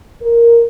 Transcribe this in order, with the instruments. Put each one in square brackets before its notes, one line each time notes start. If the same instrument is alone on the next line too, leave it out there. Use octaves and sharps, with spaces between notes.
[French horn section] A#4